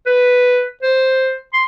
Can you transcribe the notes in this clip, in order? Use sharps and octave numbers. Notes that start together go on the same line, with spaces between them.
B4
C5
C6